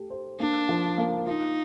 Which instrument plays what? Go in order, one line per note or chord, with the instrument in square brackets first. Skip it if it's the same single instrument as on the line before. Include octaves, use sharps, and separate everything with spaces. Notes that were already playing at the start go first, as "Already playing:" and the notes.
Already playing: [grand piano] A3 G4
C5
[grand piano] A#3 [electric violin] D4
[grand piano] F3
A#3
[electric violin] D#4 [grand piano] F4